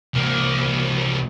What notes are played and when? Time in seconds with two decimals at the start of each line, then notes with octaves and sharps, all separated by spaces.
0.14 C2 A#3